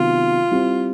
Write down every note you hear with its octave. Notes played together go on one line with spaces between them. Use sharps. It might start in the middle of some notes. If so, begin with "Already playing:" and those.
Already playing: C3 D#3 F#3 B3 F4
G3 C4 E4